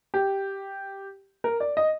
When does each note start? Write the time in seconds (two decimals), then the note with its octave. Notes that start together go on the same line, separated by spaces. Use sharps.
0.14 G4
1.44 A#4
1.60 D5
1.77 D#5